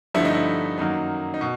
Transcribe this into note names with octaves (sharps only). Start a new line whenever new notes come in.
G2 D3 F3 A3 E4
D#4
E4
F#2 D#3 F#3 A#3 D#4
D#4
B2